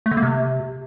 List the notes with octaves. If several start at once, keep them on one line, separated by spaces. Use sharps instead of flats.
A3
D3
A#3
C3